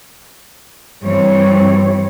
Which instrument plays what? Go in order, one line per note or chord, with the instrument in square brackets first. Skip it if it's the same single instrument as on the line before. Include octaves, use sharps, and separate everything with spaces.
[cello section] G2 E3 G3 C4 C#5